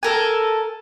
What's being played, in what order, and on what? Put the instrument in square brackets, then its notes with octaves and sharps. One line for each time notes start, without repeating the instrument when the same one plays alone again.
[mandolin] A4 A#4 G#5